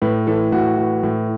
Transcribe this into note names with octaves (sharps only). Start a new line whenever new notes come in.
A2 B4
E3 A4
A2 F#4
E3
A2